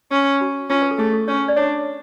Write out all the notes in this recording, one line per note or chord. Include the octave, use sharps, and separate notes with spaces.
C#4
F#4
C#4 F4
B4
A4
A3 G#4
A4
C#4 C#5
D5
D4 C#5